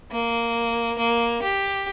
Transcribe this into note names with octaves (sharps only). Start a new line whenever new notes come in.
A#3
A#3
G4